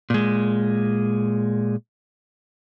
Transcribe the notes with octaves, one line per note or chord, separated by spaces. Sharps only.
A#2 G#3